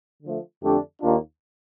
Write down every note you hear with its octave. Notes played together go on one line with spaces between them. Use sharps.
D3 F3 A3
F2 D3 A3 D4 G4
D#2 D#3 A#3 D4 F4